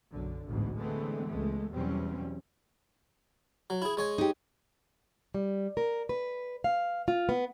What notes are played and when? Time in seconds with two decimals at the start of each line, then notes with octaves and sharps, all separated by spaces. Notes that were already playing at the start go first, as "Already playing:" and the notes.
0.11 B1 F#2 D3
0.45 A1 D2 G#2 B2
0.78 D3 E3 G#3 A3 B3 C4
1.28 C#2 G#3 A3
1.73 E2 B2 F#3 G3 C4 C#4
3.70 F#3
3.82 E4 G#4
3.97 G#3 C#5 G#5
4.18 D#4 G4
5.34 G3
5.77 A#4
6.09 B4
6.64 F5
7.08 F4
7.29 B3